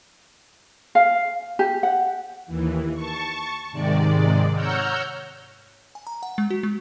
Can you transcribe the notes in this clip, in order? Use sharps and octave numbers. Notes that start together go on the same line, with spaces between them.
F5
G4
F#5
D#2 E3
A5 C#6
G#2 C3 D#3 G#3 D5
C#5 F#5 A#5 E6 F6 G6
G#5
A#5
F#5
G#3
F#4
G#3